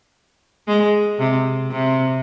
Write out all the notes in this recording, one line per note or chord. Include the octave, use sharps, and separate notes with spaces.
G#3
C3
C3